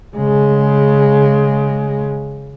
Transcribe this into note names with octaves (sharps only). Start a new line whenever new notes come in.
C#3 G#3